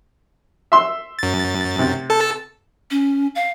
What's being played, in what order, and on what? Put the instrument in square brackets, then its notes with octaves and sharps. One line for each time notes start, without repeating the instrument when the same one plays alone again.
[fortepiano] E5 C6 E6
[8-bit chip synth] F#2 A6
[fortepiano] C3
[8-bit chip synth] A4 A5
[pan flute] C#4
F5